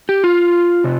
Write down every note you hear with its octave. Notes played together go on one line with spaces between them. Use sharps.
G4
F4
C3